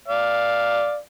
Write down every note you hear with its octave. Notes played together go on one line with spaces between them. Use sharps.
D5 F5